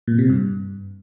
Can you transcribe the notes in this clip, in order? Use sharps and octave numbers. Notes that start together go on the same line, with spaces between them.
A#2
C3
G2